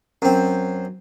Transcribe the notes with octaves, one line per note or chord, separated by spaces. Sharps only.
F#2 C4